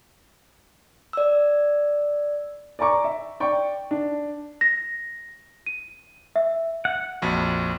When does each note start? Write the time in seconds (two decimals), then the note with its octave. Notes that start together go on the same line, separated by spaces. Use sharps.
1.13 D5 E6
2.79 D5 G#5 A#5 C#6 D6
3.04 E5
3.40 D5 G5 C#6
3.91 D4
4.61 A#6
5.66 D#7
6.36 E5
6.85 F#5
7.22 A#1 F2 F#4